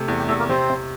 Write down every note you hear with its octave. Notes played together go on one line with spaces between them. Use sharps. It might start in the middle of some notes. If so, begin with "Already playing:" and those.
Already playing: C3 A3
E2
G4
E2 A3 A4
A#3 A#4
C3 C4 C5
C3